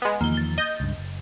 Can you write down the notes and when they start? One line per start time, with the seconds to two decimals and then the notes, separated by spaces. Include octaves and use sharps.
0.02 G#3 B3
0.21 E2 D#3 F3 A#3 G7
0.37 A6
0.58 D#5 G6
0.80 C#2 G2
0.98 F#1